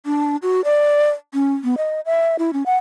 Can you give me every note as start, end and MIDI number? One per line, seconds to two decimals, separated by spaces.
0.06 0.36 62
0.42 0.61 66
0.64 1.08 74
1.34 1.53 61
1.64 1.75 59
1.78 2.00 75
2.06 2.36 76
2.39 2.51 64
2.53 2.66 61
2.66 2.75 78